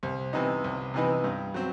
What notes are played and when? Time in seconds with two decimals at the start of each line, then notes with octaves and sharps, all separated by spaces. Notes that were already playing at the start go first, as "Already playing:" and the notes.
0.03 C2
0.33 C3 E3 B3 D#4
0.64 C2
0.94 C3 E3 B3 D#4
1.24 G2
1.54 F#3 C4